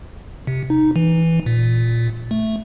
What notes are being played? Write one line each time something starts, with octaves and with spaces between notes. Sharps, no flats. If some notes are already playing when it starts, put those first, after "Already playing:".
C3
D#4
E3
A#2
A3